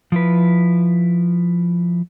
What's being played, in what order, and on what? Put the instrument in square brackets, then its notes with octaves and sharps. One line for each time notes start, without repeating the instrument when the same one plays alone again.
[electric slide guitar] F3 E4 B4